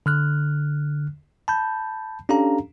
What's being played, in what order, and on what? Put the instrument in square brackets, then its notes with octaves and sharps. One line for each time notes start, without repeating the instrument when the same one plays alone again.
[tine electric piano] D3 F6 F#6
A5 B5 G6
C#4 D4 G4 A4 F5 A#5